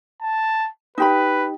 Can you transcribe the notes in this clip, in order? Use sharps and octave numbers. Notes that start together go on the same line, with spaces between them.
A5
D#4 G4 B4 B5